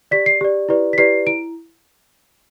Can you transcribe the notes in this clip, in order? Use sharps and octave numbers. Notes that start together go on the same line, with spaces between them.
G4 D5 B6
C7
G4 D5
E4 G4 B4 D5
B6
E4 G4 B4 D5 C7
E4 D7